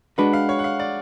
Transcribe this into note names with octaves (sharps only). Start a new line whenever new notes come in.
G#3 D4 F#4 B4 F#5
F5
C#5
F#5
F5
D5